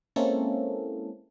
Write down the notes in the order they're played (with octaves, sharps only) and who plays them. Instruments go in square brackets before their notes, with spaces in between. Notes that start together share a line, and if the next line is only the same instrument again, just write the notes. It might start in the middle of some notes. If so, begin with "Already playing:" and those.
[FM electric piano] G#3 A#3 C4 C#4 E4 A4